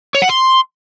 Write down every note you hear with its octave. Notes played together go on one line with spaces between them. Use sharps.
C#5
F#5
C6